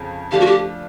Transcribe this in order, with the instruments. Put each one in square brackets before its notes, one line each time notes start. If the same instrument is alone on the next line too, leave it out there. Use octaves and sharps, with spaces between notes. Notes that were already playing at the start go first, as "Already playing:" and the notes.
Already playing: [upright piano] F2 C#3 F3
[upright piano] F3 A3 D4 F4 [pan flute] G4
[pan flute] F#4
G4